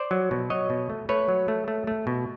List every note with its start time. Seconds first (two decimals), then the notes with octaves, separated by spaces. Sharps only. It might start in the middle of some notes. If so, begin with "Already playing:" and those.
Already playing: C5 D5
0.11 F#3
0.31 B2
0.50 F#3 C#5 D#5
0.70 B2
0.90 A3
1.09 A3 B4 C#5
1.28 F#3
1.48 A3
1.68 A3
1.87 A3
2.07 B2